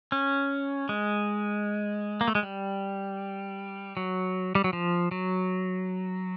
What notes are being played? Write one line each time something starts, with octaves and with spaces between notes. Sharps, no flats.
C#4
G#3
A#3
A3
G#3
G3
F#3
G3
F#3
F3
F#3